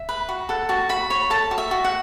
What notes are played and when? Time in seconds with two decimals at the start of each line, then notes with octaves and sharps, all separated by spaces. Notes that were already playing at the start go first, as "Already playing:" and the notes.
Already playing: E5
0.09 B4
0.29 F#4
0.49 A4 F#5
0.69 F#4 A5
0.89 F#4 B5
1.10 C#5 B5
1.30 A4 A5
1.51 F#4
1.58 E5
1.71 F#4
1.84 F#5